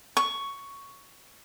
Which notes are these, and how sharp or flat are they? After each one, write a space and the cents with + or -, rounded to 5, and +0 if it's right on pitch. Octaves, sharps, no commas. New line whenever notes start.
C#6 +5